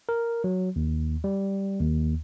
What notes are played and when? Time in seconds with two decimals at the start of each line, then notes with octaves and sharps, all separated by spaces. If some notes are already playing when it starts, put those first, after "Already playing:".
0.09 A#4
0.44 F#3
0.76 D#2
1.24 G3
1.80 D#2